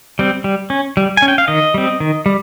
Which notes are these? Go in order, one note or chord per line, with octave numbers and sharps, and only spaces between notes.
G3 C4
G3
C#4
G3
C#4 G#5
G5
F5
D#3 D#5
G3 C4
D#3
G3